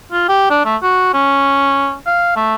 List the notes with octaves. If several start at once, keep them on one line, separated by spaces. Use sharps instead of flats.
F4
G4
D4
A3
F#4
C#4
F5
A3